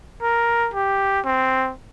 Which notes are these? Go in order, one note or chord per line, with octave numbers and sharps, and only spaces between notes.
A#4
G4
C4